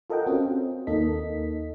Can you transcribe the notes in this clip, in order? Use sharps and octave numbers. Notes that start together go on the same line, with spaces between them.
F4 A4 A#4 D#5 F#5 G5
C4 C#4 F4 F#4
D#2 A#3 D#4 A4 D#5 B6